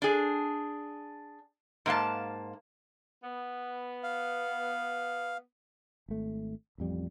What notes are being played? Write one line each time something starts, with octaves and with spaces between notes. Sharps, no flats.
D4 G#4
G#2 A#3 F5 A5
B3
F5
G#1 A3
A1 F2 G3